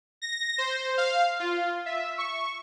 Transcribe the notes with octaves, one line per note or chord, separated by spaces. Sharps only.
A#6
C5
F5
F4
E5
C#6